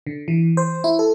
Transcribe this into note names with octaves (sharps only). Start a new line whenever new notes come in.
D3
E3
C5
E4
A4